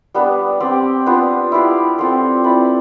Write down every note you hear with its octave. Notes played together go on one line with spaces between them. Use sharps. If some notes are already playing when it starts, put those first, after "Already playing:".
G3 B3 D4
C4 G4 D5
B3 D4 F4
E4 G4 D5 F5
C4 F4 A4
C4 E4 B4 D5